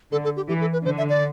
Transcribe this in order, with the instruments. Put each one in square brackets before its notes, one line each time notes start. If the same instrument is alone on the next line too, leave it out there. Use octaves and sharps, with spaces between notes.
[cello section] D3 [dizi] A4
[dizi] A4
G4
[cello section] E3 [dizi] G4
[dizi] A4
B4
[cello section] D3 [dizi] C5
[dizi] E5
D5